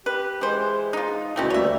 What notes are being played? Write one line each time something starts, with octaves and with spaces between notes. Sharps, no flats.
G4 B4
E3 G#3 C5
D#4 F4
D2 B2 A3 C4 C#4 E4
D2 G3 A#3 C#5 E5